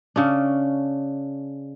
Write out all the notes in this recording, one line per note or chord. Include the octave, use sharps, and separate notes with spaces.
C#3 C#4 D4